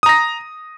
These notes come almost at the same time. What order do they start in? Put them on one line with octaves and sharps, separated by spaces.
D#6 A#5 A#6